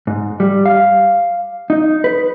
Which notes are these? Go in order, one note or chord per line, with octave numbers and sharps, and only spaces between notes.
G#2
G3
F5
D#4
B4